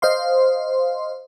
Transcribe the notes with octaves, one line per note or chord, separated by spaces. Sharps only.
C5 D#5 F5 C6